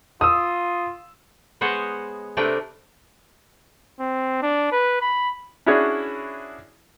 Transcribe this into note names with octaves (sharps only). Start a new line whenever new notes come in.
F4 D#6 E6
G#3 B3 C5 C#5 D#5 F#5
C3 A3 D4 A#4 B4 G5
C4
D4
B4
B5
C#4 D4 E4 F#4 G#4 C#5